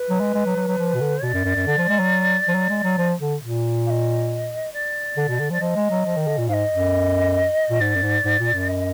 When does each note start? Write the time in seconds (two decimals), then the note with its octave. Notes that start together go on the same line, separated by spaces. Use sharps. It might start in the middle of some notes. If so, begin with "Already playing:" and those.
Already playing: B4
0.10 F#3
0.20 G#3
0.34 G#3
0.46 F#3
0.56 F#3
0.68 F#3
0.79 F3
0.95 B2
1.01 D3
1.23 B2 D5
1.34 F#2
1.44 F#2
1.56 F#2
1.67 D3
1.78 F3
1.89 G#3
1.99 F#3
2.48 F3
2.54 F#3
2.69 G#3
2.83 F#3
2.98 F3
3.20 D3
3.42 A#2
3.86 F5
3.90 D#5
4.73 D5
5.17 D3
5.29 B2
5.39 D3
5.50 F3 D5
5.61 F3 D#5
5.76 G#3
5.91 F#3
6.05 F3
6.16 D#3
6.27 D3
6.38 A#2
6.48 G#2 D#5 F5
6.71 F#2
7.70 A#2
7.80 G#2 D5
7.95 F#2
8.02 G#2
8.24 G#2
8.39 A#2
8.54 F#2
8.68 D#5